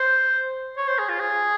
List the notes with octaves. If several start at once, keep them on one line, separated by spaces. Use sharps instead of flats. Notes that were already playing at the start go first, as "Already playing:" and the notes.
Already playing: C5
C#5
C5
G#4
F4
G#4